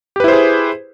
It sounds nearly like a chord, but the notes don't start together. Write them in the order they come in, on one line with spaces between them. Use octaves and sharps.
G4 B4 E4 C5 G#4